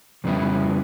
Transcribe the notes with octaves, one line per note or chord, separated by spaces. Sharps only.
F2 C#3 G3 B3 E4